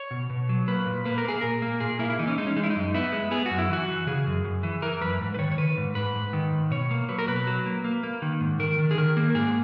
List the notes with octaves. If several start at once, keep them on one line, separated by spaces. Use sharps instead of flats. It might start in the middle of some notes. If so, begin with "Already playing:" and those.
Already playing: C#5
B2
B2
F#3
A#3 B4
A#2
A#3 B4
A#4
A#3 G#4
A#2 A#4
A#3
A#2 G#4
A#3 E4
E4
E3 D#4
C#4
G#3 D#4
C#4
G#3 D#4
E4
D#4
F#2
B3 E4
G#3
B3 G#4
F#2 F#4
E4
E3 F#4
E3
C#3 G#4
F#2
F#2
E3
E3 A#4
F#2 B4
G#2
B4
D#3 C#5
C#5
D#3 B4
G#2
G#2 B4
G#2
D#3
G#2
B2 C#5
A#3
F#3 B4
A#4
B2 B4
F#3
A#3
A#3
A#3
D#3
G#2
D#3 A#4
D#3
G#4
D#3 A#4
A#3
A#4
G#2 G#4